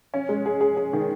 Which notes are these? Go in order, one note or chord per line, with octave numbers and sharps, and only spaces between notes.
C#4
G#3
G#4
G#4
G#4
D#3